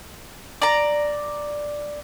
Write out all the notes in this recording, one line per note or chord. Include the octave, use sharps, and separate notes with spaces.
D5 A#5